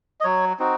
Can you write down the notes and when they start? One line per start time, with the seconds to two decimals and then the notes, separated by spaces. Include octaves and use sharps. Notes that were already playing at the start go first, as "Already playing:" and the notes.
0.20 D#5
0.24 F#3 C#5
0.59 C4 D#4 F#4